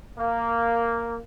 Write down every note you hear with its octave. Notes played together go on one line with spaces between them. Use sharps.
A#3